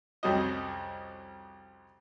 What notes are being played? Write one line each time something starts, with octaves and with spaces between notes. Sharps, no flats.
C2 F2 G3 C#4 F#4 D#5